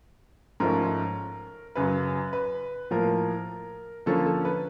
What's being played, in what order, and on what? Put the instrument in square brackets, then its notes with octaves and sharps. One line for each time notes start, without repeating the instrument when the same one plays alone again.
[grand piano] G#2 F3 A3 C#4 A#4
F#2 C#3 F#3 B4
B4
A2 F3 A#3 A#4
D3 F3 A#3 C#4 A4
A4
B4